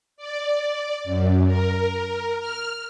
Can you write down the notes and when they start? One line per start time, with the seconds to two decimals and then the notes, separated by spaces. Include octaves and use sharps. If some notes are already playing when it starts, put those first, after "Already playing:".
0.16 D5
1.04 F#2
1.45 A#4
2.36 F6